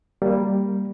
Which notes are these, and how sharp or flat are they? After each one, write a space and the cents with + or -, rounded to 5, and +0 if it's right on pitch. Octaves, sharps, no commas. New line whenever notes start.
G3 +0 A#3 +0